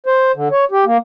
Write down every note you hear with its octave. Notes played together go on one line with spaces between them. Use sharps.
C5
D3
C#5
G4
A#3